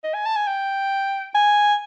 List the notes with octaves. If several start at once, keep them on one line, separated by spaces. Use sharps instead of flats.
D#5
G#5
A5
G#5
G5
G#5